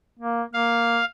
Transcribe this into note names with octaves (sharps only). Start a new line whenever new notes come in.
A#3
A#3 F5